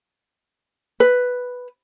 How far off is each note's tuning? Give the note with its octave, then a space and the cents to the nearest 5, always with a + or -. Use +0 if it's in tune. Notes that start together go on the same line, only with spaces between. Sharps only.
B4 +0